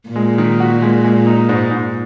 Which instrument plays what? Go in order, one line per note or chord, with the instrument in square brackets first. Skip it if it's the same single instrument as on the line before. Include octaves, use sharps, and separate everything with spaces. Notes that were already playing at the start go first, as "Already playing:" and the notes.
[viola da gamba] A#2
[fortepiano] G#3
D#3
F#4
G#3
G#3
D#4
G#2
G#2